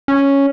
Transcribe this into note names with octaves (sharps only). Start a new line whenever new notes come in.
C#4